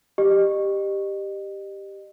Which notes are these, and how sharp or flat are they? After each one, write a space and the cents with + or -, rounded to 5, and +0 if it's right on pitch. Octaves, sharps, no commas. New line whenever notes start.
G4 +0 D#5 -35